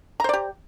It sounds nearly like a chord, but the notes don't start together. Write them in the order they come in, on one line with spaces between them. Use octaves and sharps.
A#5 C5 D5 G4